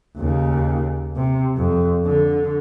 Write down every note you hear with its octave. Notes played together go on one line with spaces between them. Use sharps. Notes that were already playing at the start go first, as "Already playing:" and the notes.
D#2 C#3
C3
F2
D3